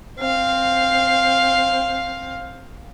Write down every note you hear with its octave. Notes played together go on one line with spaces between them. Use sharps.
C4 F5